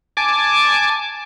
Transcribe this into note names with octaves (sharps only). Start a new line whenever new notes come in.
G#5 A5 D6